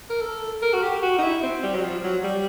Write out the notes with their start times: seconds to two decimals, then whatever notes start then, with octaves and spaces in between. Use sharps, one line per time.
0.10 A#4
0.22 A4
0.62 A#4
0.73 F#4
0.82 G4
1.03 F#4
1.19 D#4
1.23 E4
1.43 C4
1.63 G3
1.75 F#3
1.83 F3
2.04 F#3
2.24 G3